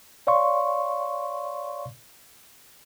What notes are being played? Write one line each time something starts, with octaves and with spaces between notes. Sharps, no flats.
C#5 D5 F5 C6 C#6